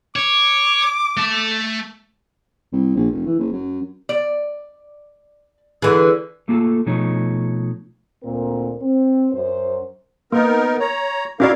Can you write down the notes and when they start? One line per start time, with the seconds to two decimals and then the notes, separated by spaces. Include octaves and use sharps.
0.16 C#5 D6
1.17 A3 A5
2.72 C2
2.95 A#1
3.11 F1
3.26 E3
3.39 F#1
3.52 F#2
4.09 D5
5.82 D3 E3 G#4
6.48 A3 A#3 F4 F#4 A4
6.86 B2 F3 A3 D#4 C#5
8.24 D2 A#2 C4 A#4
8.83 C4
9.33 F#2 C5
10.32 A#3 B3 D#4 A#4
10.80 C#5 A#5
11.40 C#4 E4 F#4 A#4 D5 F5